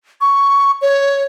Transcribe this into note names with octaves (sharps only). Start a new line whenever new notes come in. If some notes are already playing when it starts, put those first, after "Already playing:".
C#6
C#5